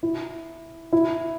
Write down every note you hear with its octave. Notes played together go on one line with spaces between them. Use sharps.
E4
E4